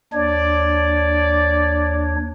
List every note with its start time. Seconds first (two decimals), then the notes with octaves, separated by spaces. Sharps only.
0.13 D#2 D4 C#5 D5